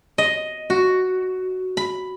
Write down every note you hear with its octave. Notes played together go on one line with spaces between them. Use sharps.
D#5
F#4
B5